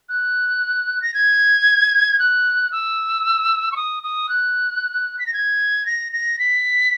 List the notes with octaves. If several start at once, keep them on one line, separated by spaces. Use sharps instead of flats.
F#6
A#6
G#6
F#6
E6
C#6
D#6
D#6
F#6
B6
A#6
G#6
A#6
A#6
B6